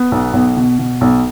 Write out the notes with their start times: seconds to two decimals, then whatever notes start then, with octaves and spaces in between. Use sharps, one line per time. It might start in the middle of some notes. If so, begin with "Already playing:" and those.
Already playing: B3
0.12 B1
0.33 B1
0.57 B2
0.79 B2
1.01 B1